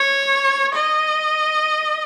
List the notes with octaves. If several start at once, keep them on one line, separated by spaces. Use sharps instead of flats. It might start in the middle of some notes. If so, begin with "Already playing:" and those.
Already playing: C#5
D#5